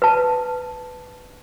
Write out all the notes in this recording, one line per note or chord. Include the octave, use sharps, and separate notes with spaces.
B4 A5